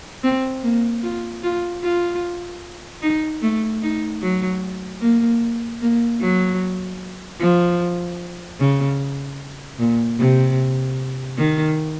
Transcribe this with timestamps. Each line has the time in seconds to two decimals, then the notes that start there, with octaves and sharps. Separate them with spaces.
0.23 C4
0.63 A#3
1.03 F4
1.43 F4
1.82 F4
3.02 D#4
3.42 A3
3.82 D#4
4.21 F#3
5.01 A#3
5.81 A#3
6.20 F#3
7.40 F3
8.60 C#3
9.79 A#2
10.19 C3
11.37 D#3